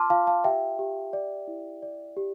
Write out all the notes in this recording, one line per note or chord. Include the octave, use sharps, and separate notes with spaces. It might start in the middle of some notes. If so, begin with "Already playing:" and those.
Already playing: F4 A5 C6 D6 F6
F4 F5 A5
F5 A5
G4 E5 G5
G4
D5
E4
D5
G4